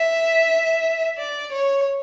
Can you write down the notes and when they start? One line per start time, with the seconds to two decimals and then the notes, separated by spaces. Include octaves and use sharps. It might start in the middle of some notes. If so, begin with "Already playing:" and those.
Already playing: E5
1.17 D5
1.52 C#5